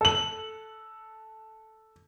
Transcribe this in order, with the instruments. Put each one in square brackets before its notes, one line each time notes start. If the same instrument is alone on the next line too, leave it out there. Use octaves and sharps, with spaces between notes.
[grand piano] A4 F#7